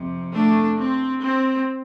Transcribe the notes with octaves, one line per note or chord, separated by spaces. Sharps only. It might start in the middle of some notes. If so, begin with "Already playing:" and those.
Already playing: F2 C3
A3 D4
C4
C4